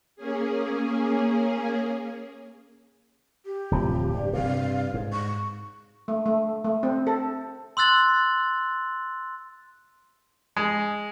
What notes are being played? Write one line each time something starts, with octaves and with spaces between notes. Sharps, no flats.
A#3 C#4 G#4
G4
D1 C3 F3
G2
G2 C3 F5
G#2
C#6
A3
A3
A3
C4
A4
C6 E6 F#6 A6 F#7
G#3